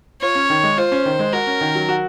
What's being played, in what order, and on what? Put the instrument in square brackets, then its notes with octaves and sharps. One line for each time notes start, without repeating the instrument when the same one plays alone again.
[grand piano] F4 [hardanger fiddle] C#5
[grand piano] C#4
D#3
G#3
[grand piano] F4 [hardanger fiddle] C5
[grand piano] C#4
D#3
G#3
[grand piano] F#4 [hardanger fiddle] A#4
[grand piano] C#4
D#3
F#3
F#4